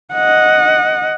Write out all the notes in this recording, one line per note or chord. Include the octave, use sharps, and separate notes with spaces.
D#5 F#5